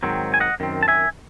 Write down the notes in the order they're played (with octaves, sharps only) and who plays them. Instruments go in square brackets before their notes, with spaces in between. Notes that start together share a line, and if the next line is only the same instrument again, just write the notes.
[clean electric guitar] G#2 D#3 F#3 C4
G#5
D#5 F#5
F#2 D#3 C4
A5
E5 G#5